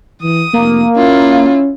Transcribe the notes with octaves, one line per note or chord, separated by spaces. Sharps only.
E3 D#6
F1 A#3
C#4 E4 F4